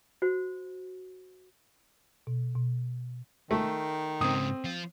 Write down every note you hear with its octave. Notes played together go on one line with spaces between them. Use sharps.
F#4 C5
B2
B2
D#3 A3
G#2 C#3 C4 D#6
F3 F4